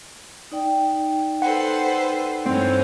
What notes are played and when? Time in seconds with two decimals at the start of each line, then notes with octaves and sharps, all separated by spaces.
0.52 D#4 D5 G5
1.42 A4 B4 C5 F#5
2.46 G2 E3 C4 C#4